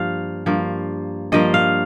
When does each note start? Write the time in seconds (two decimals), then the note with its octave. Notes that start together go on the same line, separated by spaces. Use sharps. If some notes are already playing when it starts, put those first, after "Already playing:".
Already playing: G2 F3 A#3 F5
0.46 G2 F3 A#3
1.32 G2 F3 A#3 D#5
1.54 F5